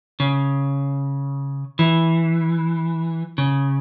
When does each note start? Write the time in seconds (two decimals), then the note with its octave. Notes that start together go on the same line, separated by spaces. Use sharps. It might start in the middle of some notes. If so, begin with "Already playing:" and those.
0.20 C#3
1.79 E3
3.38 C#3